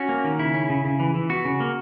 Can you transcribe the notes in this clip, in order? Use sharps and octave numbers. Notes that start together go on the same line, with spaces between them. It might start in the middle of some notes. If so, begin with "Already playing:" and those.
Already playing: C#4 F#4
A#3
D#3
C#3 E4
C#4
C#3
C#3
E3
E3
B3 F#4
C#3
A#3